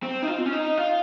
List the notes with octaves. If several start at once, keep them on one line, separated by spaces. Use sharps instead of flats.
C4
D#4
F4
C4
C#4
D#4
F4